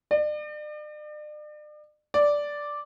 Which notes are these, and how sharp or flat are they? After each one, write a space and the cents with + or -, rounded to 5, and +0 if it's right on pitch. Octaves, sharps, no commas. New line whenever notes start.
D5 +40
D5 -5